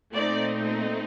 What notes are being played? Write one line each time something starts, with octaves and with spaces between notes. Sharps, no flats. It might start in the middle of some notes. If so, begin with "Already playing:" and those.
A#2 A3 C4 D#4 D5